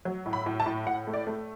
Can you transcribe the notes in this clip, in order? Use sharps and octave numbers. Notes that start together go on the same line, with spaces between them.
F#3
A2
B5
A2
A5
A2
A2 F#5
A3
D5
A3